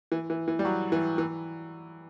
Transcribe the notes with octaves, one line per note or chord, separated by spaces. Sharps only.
E3
E3
E3
G3
F#3
E3
E3